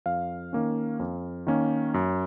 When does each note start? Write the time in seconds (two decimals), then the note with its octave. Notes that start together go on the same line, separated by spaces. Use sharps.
0.06 F2 F5
0.53 D#3 A#3 C#4
1.00 F2
1.47 D#3 A#3 C#4
1.94 F#2